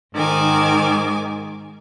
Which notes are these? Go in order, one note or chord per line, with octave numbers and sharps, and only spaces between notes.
G#2 D#3 G#5 D6